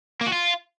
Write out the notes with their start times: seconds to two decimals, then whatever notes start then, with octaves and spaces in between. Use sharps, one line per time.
0.21 A#3
0.27 F#4
0.32 F4